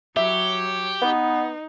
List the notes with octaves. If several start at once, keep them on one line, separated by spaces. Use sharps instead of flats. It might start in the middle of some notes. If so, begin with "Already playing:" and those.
F#3 G4 C#5 E5
B3 D#4